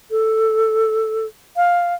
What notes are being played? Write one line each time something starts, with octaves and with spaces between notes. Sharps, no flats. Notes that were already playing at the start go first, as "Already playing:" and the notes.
A4
F5